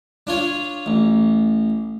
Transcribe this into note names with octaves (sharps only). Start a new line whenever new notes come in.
D4 F4 C#5
A1